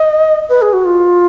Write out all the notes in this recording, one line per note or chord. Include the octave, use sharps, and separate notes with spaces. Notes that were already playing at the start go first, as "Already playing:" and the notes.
Already playing: D#5
B4
G#4
F#4
F4